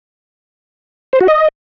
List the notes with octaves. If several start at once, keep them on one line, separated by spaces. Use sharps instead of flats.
C5
F#4
D#5